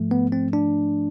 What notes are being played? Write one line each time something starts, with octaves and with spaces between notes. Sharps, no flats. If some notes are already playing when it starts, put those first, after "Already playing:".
Already playing: G#2 F3 A3
B3
C4
D4